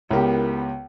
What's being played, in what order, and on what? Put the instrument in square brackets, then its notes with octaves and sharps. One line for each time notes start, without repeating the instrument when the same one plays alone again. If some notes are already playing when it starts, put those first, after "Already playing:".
[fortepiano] C#2 G4 [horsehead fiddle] B3 [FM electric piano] E4 A#4